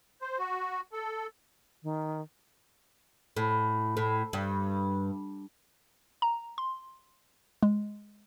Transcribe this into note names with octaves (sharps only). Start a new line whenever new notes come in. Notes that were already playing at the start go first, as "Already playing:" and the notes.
C5
F#4
A4
D#3
A2
A2
G2
A#5
C6
G#3